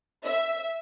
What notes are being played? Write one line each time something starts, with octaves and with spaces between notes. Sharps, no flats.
E5